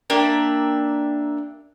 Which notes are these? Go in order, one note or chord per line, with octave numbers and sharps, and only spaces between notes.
A#3 D4 G4 E5